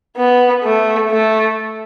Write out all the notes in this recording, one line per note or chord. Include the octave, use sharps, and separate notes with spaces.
B3
A3
A3